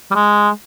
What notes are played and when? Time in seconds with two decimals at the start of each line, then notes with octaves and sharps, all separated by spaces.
0.11 G3
0.15 G#3